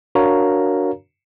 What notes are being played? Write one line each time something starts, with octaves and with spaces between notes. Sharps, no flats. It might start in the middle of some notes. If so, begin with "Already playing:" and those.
D4 F#4 A#4 C#5 F5 A#5